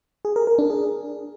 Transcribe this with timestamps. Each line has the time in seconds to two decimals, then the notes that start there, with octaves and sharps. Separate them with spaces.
0.25 G#4
0.36 A#4
0.47 A#4
0.59 D4
0.70 G#4